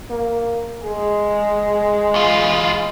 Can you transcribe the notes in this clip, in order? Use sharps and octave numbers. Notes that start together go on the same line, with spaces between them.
A#3
G#3 G#4
E2 F4